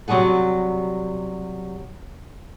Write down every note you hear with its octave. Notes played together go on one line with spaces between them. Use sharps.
C3 F#3 G3 G#4 F#5